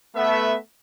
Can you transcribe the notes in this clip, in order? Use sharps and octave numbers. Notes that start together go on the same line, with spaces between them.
A3 B3 E5